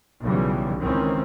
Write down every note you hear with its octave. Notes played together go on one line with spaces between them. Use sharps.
B1 C#3 E3 G3
C#2 D#3 E3 C4 C#4